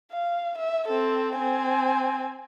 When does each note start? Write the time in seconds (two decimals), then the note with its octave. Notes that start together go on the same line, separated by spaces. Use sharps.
0.12 F5
0.58 E5
0.88 C4 A4
1.37 C4 G#5